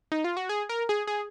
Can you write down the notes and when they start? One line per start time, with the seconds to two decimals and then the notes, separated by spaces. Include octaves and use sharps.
0.12 D#4
0.24 F4
0.37 F#4
0.49 G#4
0.69 A#4
0.89 G#4
1.07 G#4